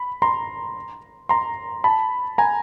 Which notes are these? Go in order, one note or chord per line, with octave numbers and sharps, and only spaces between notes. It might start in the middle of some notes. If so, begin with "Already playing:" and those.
Already playing: B5
A#5 C6
A#5 C6
A5 B5
G#5 A#5